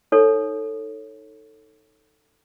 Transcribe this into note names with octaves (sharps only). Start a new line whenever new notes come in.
D#4 A4 C#5